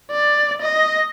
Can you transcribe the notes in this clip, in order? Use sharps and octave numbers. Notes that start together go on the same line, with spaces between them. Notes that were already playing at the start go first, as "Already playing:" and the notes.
D5
D#5